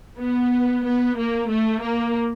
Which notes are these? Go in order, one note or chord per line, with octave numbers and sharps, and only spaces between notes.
B3
B3
A#3
A3
A#3